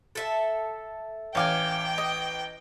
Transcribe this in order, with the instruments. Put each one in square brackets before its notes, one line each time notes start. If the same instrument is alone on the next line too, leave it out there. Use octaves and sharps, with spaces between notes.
[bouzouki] A4 E5
[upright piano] A1 D6 [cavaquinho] C#5 F5 G#5 [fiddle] G5
[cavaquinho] D#5